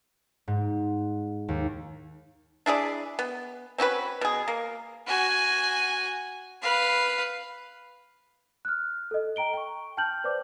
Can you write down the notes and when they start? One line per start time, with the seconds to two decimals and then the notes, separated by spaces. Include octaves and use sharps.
0.48 G#2
1.48 D#2
2.66 D4 E4 G#4 D5
3.19 B3
3.78 C4 C#4 F#4 B4
4.21 B2 G#4
4.48 A#3
5.06 F#4 G#5
6.62 B4 F5
8.65 F6 F#6
9.11 A4 D#5
9.36 G5 A#5 D7 G7
9.53 G5 C#6
9.97 G5 A5 F6 G6 F#7
10.24 B4 C5 D5 D6